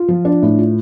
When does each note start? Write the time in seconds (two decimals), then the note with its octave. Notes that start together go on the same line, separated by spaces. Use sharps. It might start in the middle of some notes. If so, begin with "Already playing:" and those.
Already playing: F4
0.08 F3
0.25 D4
0.42 A2
0.59 F4